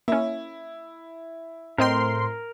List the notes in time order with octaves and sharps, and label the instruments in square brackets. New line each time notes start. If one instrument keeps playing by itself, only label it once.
[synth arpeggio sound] A#3 C#4 [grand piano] E4
[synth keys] A2 C5 C6 [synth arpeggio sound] C4 D#5 G5 [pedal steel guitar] A#4